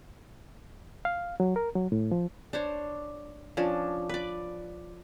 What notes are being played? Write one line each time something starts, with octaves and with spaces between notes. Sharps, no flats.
F5
F#3
A#4
F#3
A2
F3
D4 C5 C#5
F3 C#4 D4
B4 D5